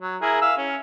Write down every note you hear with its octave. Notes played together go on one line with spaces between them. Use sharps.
F#3
E4 G#4 A#4
E5 F5 E6
C#4